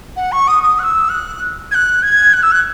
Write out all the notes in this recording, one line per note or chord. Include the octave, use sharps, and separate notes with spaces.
F#5
C#6
D#6
D#6
F#6
E6
F#6
G#6
F#6
G#6
F#6
E6
F#6